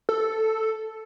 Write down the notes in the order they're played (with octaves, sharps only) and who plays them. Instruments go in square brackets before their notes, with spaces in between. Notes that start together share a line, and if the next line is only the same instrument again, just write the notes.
[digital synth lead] A4